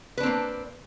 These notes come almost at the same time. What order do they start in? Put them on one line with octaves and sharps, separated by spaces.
B4 D4 C4 A#3